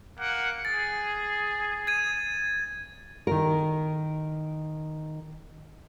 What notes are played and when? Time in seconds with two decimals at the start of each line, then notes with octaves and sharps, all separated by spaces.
0.18 A#3 F#5
0.65 G#4 A6
1.87 G#6 D#7
3.27 D#3 A#4